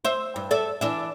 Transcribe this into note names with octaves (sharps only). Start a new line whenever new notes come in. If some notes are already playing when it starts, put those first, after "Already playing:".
C5 E5
G2
A4 D5 E5
E3 D4 E5